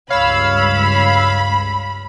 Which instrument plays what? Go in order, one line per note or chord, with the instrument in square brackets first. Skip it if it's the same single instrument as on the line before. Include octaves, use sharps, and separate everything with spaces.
[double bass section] C#2 G2 [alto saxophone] C#5 [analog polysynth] F5 E6 [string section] B5